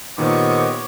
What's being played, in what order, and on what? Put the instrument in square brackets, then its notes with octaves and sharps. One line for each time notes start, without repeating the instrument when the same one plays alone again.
[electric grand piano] A#2 D#3 [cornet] B3 [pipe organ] G4 C5 D#5 [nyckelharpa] C#5 D6